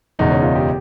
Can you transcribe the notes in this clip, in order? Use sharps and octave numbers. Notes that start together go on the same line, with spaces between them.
F#1 E2 B2 G#3 D#4
C#4
F4
G4